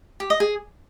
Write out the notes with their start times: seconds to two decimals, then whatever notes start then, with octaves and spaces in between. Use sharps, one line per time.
0.20 G4
0.30 D#5
0.40 G#4